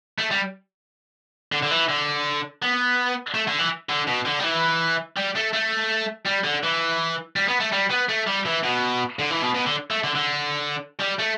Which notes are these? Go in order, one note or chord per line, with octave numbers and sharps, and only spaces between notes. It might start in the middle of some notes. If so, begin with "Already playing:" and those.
A3
G3
D3
D3
E3
D3
B3
A3
D3
E3
D3
B2
D3
G3
E3
G3
A3
A3
G3
D3
E3
G3
B3
A3
G3
B3
A3
G3
E3
B2
D3
E3
B2
B2
D3
A3
D3
D3
G3
A3